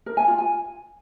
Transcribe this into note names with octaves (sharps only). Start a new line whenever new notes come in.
A#4
G#5
F4
G#5